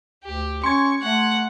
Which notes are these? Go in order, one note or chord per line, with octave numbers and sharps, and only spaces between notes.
D2 G4
C#4 C6 C#6 G#6
A3 F#5